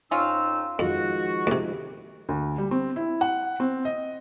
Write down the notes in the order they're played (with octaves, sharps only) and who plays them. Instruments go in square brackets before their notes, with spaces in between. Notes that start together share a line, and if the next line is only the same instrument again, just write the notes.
[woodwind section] F2 D#4 E6 [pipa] C#4 F4
[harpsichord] F2 [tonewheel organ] D#3 F3 G#3 [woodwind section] F#4
[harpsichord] D2 C3
[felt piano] D2
G3
C4
E4
F#5
C4
D#5